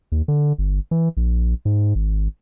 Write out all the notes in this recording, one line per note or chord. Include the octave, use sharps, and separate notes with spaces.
D#2
D3
G1
E3
A#1
G#2
G#1